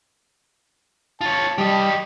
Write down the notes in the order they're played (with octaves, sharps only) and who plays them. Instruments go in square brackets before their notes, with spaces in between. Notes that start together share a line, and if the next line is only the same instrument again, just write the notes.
[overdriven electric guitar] F4 C#5 [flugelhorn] A5
[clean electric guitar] G3 [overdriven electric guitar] G4 D#5